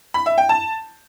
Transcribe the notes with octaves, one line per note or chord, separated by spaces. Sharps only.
B5
E5
G5
A5